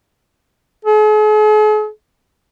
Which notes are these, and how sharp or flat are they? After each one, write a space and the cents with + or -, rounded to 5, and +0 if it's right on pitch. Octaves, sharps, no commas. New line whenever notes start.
G#4 +45